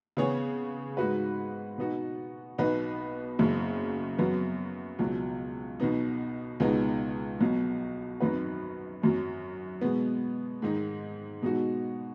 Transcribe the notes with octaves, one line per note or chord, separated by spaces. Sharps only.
C#3 B3 G#4 C#5
G#2 G#3 D#4 F#4 B4
B2 B3 D#4 F#4
B1 B2 B3 D#4 B4
F#1 F#2 C#3
F#2 F#3 B3
C#2 B2 F#3
B1 B2 B3 D#4
C#2 B2 G#3 B3 D#4
B1 B2 F#3
G#1 F#2 F#3 D#4 B4
G#1 F#2 F#3
B2 G#3 B3
G#2 D#3 G#3 D#4
B2 G#3 D#4 F#4